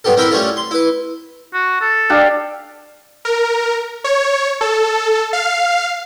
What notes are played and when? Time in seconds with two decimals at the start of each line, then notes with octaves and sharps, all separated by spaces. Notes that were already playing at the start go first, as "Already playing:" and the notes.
0.04 G2 B3 G4 A4
0.17 C4 E4 A#4 E5 G5 B5
0.31 G3 A3 C#4 F4 A4
0.57 C6
0.71 E4 B4
1.54 F#4
1.81 A4
2.10 D4 G4 F5
3.25 A#4
4.04 C#5
4.61 A4
5.33 F5